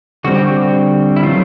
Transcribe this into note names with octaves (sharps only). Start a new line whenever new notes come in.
D3 G3 C4 F#4
G4
F#4
E4
D#3 F#3 A3 F4